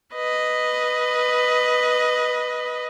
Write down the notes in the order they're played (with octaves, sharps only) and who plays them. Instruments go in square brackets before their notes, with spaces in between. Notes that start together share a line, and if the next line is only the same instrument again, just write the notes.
[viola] B4 D#5